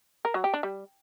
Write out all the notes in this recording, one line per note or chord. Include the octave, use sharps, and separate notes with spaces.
A#4
F#3
G4
D4
G3